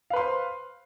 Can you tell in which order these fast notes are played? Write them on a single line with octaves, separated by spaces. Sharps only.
F5 B4 C6 C5